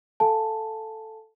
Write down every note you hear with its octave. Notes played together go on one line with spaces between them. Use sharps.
A4 F5 G#5 A5